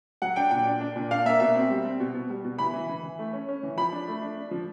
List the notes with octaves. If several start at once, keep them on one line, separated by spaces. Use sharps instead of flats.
F#3 F#5
D4 G5
A#2 G5
D4
D4
A#2
D4 F5
A#3 E5
B2 E5
C4
G3
C4
B2
B2
G3
B2
E3 B5
E3
E3
E3
A3
C#4
C#4
E3
F3 B5
D4
A3
D4
D4
F3